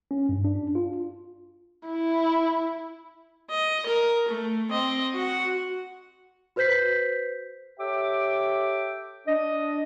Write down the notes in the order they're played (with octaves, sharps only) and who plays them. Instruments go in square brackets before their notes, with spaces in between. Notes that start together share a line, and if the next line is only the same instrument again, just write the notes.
[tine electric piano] C#4
G2
D4
F4
[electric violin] E4
[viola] D#5
A#4
A3
C4 D#5
F#4 F#5
[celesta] F#4 B4 C5 G6 B6 C7
[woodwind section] G4 A4 C#5 E5 G5 D6
D4 D#5